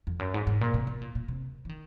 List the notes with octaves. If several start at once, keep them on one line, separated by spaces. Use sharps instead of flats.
F2
F#2
G#2
G#2
A#2
C3
B2
A#2
A#2
C3
E3
D#3